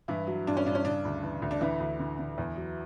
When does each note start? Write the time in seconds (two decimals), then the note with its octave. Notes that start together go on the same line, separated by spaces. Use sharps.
0.08 G2 E3 E4
0.27 F#3
0.47 G2 D4
0.57 C#4
0.66 G2 D4
0.75 C#4
0.85 C#3 D4
1.05 D2
1.23 E3
1.42 D2
1.51 D4
1.61 D3 E3 E4
1.80 D2
2.00 D3
2.19 D3
2.38 E2
2.57 F#3